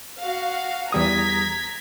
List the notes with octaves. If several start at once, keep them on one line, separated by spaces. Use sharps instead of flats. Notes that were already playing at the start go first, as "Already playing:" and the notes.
F#4 F5
E2 G3 A#5 D#6 G#6 B6